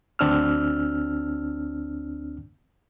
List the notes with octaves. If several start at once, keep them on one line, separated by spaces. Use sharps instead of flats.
D2 C4 D4 E6 F6